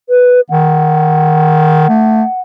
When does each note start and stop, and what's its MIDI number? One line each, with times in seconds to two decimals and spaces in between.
0.09 0.41 71
0.50 1.86 51
0.50 2.41 78
1.89 2.23 57